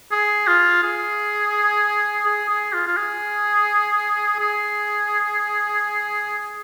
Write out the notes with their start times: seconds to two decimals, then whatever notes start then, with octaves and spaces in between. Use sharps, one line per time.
0.12 G#4
0.47 F4
0.83 G#4
2.25 G#4
2.49 G#4
2.73 F4
2.87 F4
2.97 G#4
4.39 G#4